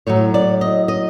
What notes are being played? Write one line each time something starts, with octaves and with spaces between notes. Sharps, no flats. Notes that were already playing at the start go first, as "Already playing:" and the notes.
A2 F#3 C#5
D5
D#5
D#5